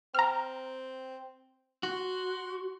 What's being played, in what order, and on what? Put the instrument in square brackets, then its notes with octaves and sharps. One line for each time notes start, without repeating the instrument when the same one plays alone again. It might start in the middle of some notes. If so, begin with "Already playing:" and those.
[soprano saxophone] C4 [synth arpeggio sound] A#5 F6
[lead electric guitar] F#4 [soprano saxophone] C6